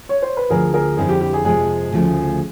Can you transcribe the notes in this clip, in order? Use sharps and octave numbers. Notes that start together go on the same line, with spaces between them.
C#5
C5
B4
D2 D3 F3 G#4 A#4
G#4 A#4
F2 D3 G3 C4 E4 G#4
G4
G4
G#4
F2 C3 F3 G#3 G#4
D2 C#3 F3 A3